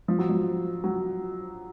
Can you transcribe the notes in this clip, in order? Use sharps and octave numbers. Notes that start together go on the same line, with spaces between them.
F3
F#3
F3
F#3